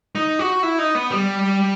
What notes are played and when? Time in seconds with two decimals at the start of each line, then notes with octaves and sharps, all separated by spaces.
0.15 D#4
0.39 F#4
0.63 E4
0.79 D#4
0.95 B3
1.11 G3